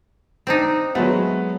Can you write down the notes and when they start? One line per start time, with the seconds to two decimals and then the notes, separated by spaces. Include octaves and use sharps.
0.47 C4 D4 D#4
0.95 F#3 G#3 A3 B3